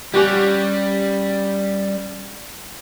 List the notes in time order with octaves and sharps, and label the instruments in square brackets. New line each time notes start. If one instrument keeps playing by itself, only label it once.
[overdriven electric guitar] G3 [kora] C#4 F#4 G4